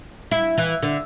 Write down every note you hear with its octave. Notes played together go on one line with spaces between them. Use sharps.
E4
E3
D3